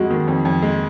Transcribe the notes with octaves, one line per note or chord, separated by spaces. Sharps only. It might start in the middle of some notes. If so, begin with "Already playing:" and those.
Already playing: F2 G#3 F#4
D#3
F2
F2
G#3